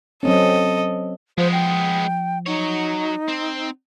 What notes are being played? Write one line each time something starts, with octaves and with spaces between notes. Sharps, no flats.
F#3 C4 C#4 A4 D#5
F3 G#3 B3 C5
G5
F#3 D#4 C#5
C4